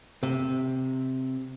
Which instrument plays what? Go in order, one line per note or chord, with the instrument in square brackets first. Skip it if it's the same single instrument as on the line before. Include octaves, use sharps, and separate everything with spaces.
[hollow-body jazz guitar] C3